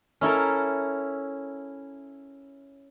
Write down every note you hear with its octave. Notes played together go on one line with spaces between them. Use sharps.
C#4 E4 A4 A#4